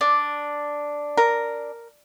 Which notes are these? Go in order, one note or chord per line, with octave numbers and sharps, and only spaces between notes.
D4
A#4